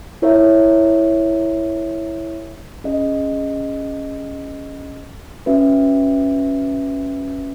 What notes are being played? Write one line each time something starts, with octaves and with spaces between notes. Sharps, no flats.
E4 A#4 C#5 E5
C#4 G#4 D#5
C#4 F#4 B4 E5